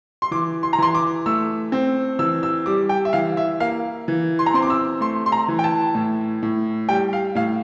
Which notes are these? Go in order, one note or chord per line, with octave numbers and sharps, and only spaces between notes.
C6
E3 D6
C6
A#5
E3 C6
D6
A3 E6
C4
E3 E6
E6
G3 D6
G5
E5
E3 F5
E5
A#3 F5
E3
C6
A#5
C4 C6
D6
E6
A3 C6
C6
A#5
E3
G5
A5
A2
A2
G3 G5
F5
A2 F5